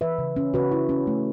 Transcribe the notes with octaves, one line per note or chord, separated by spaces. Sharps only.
E3 B4 E5
C#3
C#4
C#3 F#4 B4
E4
C#4
A3